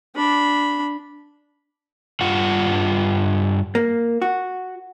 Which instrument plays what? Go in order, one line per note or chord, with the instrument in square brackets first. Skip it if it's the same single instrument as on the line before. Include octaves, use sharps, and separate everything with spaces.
[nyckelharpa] D4 B5
[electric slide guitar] G2 F4 F#5
[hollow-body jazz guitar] A#3
F#4